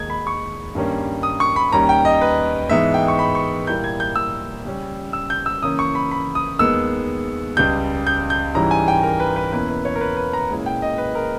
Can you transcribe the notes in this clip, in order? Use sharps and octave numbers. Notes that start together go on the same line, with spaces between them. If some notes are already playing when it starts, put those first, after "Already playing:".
Already playing: D#2 D#3 G#3 D#4 G#6
B5
C#6
G2 D#3 G3 A#3 C#4
D#6
C#6
B5
D#2 D#3 G3 C#4 A#5
G5
D#5
B4
G#2 E3 G#3 B3 D#4 E5
G5
C#6
B5
C#6
A#2 G3 A#3 E4 G6
G#6
G6
E6
C#3 G3 C#4
E6
G6
E6
C#3 E3 A#3 C#4 D#6
C#6
B5
B5
D#6
D#2 D#3 G#3 B3 E6
C#2 C#3 G3 G6
G6
G6
G#2 E3 G3 C#4 E4 A#5
G#5
G5
A#4
B4
B4
E2 B2 A#3 C#4 E4 B4
B4
C#5
A#4
B4
B4
A#5
A#2 G#3 C#4 E4
G5
D#5
B4
A#4